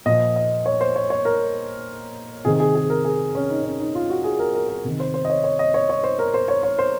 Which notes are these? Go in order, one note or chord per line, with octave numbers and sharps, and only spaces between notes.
A#2 F3 D#5
D#5
C#5
C5
C#5
C#5
A#4
C3 D#3 G#4
G#4
G#4
A#4
G#4
C#4
D#4
C#4
D#4
F4
F#4
G#4
A#4
A#4
A#4
C3 D#3
C5
C5
D#5
C#5
C#5
D#5
C#5
C#5
C5
A#4
C5
C#5
C#5
C5